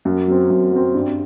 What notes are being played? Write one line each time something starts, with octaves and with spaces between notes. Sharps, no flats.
F#2
F#3 C4
F#2
F#3 C4
G2